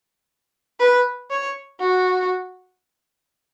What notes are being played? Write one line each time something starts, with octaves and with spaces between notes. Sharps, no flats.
B4
C#5
F#4